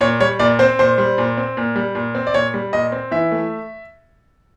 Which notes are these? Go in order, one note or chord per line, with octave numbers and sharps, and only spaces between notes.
A#2 C#5
G3 C#5
A#2 D5
C4 C5
A#2 C5
G3
A#2
C4
A#2
G3
A#2
C4
D5
A#2 C#5
G3
A#2 D#5
C4
E3 E5
A3